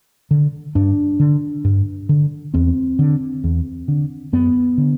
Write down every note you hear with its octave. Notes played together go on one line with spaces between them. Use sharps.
D3
G2 D4
D3
G2
D3
E2 C4
D3
E2
D3
F#2 B3
D3